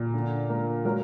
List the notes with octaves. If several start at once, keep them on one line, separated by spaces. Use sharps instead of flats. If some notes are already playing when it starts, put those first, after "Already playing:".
Already playing: A#2
D3
A#3
F#3 A#4